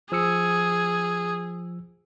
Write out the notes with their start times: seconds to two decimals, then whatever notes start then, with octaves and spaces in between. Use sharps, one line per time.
0.12 F3 G#4 E6 C#7